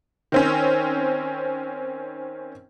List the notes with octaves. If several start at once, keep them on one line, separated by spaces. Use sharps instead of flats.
D#3 C4 C#4